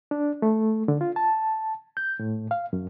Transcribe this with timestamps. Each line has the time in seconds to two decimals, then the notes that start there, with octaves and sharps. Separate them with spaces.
0.11 D4
0.42 A3
0.88 D3
1.01 F4
1.16 A5
1.97 G6
2.19 A2
2.51 F5
2.73 F#2